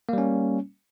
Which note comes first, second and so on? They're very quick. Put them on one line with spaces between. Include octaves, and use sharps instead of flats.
A#3 G3 C#4